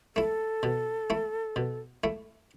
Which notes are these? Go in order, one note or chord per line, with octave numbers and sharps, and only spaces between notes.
A3 E4 A4
B2
A3 E4
B2
A3 E4